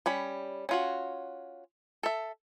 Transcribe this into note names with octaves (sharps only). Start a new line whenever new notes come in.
G3 C#4 B5
C#4 F4 F#4
A4 E5